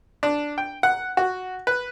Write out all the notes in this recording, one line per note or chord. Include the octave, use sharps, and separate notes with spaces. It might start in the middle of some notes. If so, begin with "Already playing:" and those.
D4
G5
F#5
F#4
B4